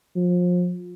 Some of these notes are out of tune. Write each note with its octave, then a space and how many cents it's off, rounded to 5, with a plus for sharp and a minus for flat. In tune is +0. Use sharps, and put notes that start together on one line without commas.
F3 +30